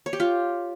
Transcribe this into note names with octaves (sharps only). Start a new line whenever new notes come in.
C#5
G4
F4